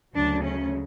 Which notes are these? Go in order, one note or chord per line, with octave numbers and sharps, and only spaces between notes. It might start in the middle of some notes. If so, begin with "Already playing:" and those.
D2 C#3 F#3 D4
C#4